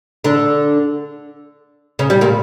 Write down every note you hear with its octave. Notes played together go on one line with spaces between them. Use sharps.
D3 D4
C#3 C#4
G3
A#2 A#3